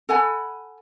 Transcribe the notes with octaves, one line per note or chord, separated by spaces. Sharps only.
A4 F#5 G#5 B5